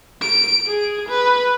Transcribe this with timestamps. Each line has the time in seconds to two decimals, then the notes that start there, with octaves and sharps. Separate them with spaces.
0.22 D7
0.67 G#4
1.09 B4